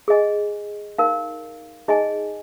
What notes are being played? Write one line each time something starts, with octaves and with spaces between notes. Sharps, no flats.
G#4 D#5 G#5
D#4 A#4 F5
D#4 G#4 D#5 G#5